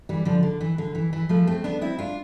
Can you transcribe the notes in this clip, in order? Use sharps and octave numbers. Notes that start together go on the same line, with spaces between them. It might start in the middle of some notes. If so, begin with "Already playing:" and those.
E3 G3
D3 F3
D3
E3
D3
E3
E3
F3 A3
A3 C4
B3 D4
C4 E4
D4 F4